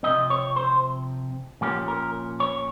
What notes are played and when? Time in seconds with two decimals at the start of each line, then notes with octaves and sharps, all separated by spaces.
0.03 C3 F3 C4 D#5
0.30 C#5
0.56 C5
1.61 A#2 F3 A#3 C#4 G4
1.88 A#4
2.40 C#5